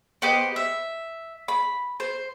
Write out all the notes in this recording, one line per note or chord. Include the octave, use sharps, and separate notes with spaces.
B3 G4 C5 D#5
E5
B5
C5